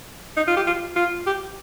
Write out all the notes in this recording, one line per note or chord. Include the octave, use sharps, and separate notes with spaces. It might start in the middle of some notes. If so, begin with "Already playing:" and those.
D#4
F4
G4
F4
F4
G4